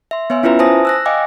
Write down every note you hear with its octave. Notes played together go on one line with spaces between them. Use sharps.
E5 C6
B3 C#5 E5 G#5 E6
C#4 E4 F4 B4 E5 A#5
C5 G#5 A5 D#6 A#6
E6 F#6 A#6
D#5 F5 G5 G#5 D6